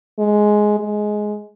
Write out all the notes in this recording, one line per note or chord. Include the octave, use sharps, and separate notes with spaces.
G#3
G#3